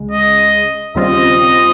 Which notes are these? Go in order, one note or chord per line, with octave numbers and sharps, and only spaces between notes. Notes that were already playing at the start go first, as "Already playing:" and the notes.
Already playing: C#2 C#3 G#3
D#5
D#2 C#3 G3 C4 F4 D#5